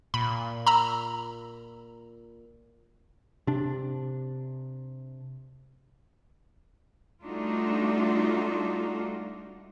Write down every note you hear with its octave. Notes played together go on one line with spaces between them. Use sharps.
A#2 B5
A#5 B5 E6
C3 D4
G3 A3 D4 D#4 F4 F#4